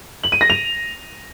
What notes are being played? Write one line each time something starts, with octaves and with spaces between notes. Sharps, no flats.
F#7
D#7
A#6
F7